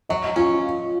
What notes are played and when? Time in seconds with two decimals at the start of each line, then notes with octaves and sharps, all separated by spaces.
0.09 F#3 D#5
0.36 C#4 F4